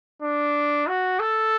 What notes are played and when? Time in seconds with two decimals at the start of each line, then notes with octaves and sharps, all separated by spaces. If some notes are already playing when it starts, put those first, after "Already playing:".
0.22 D4
0.87 F#4
1.20 A4